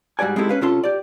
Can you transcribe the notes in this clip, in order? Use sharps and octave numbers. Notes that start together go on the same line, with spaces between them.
G#2 G3 F#4 D5 G#5
G#3 C4 D#4 E4 G4 A4
C#4 B4 F5
C3 C#4 F4 A4 C6
G4 D5